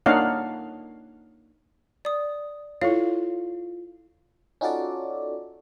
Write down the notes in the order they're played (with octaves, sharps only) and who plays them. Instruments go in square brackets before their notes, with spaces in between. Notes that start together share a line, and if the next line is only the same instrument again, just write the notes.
[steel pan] A#3 D4 D#4 C#5 F5 F#5
[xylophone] D5 D#6
[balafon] E4 A4 C#5 [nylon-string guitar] F4 [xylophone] F5
[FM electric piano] C#4 D#4 F4 F#4 A4 D5